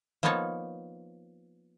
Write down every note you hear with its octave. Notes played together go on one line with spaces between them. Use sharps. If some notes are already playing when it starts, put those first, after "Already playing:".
F3 A#3 B3 D#4 C#5 A5